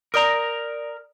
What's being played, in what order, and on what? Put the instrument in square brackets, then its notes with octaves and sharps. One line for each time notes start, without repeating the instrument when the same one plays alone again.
[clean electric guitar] A#4 A#5 [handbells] D5 D#6 D7